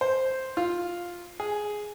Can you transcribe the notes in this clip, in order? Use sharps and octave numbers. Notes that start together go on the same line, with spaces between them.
C5
F4
G#4